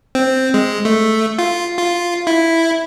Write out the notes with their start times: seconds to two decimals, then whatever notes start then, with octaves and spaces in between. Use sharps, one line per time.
0.15 C4
0.54 G#3
0.85 A3
1.39 F4
1.78 F4
2.27 E4